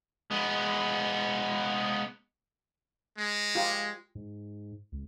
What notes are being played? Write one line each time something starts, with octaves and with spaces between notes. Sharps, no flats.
G#3 B3
G#3
F4 G4
G#2
C#2